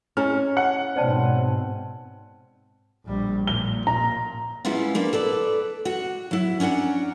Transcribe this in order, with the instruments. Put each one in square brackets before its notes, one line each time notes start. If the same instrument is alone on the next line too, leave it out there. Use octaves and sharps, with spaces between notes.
[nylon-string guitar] C#4 [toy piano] E4 G#4 A#5 [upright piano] F6
[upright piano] F#5
[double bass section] G#2 B2 C4 [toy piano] C5 D5 A5
[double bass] A#1 G3
[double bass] A#2 [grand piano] G7
[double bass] A#2 [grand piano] A#5
[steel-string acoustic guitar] G3 G#3 B3 C#4 E4 F4
A#3 D4 B4
A4 B4 D5
F#4 F#5
F#3 E4
C#4 D4 C#5 F#5 A#5